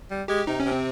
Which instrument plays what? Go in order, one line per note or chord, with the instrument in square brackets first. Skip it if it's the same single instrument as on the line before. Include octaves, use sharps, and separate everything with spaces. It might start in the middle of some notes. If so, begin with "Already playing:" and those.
[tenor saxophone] G3
[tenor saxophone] G#3 [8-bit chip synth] G4
[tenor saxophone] C3 [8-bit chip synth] D#4
[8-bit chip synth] C#4
[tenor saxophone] C3
[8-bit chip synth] C4